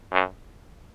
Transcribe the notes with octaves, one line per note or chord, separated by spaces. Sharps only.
F#2